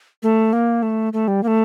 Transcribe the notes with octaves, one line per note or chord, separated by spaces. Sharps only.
A3
A#3
A3
A3
G3
A#3
A3